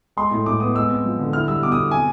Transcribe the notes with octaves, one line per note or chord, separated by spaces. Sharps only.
G#3 C6
A2
A2 D6
B3 D#6
G#3 E6
C4
F3
D3
E4 F6
G3 E6
B2 D6
D#6
B2
C4 G#5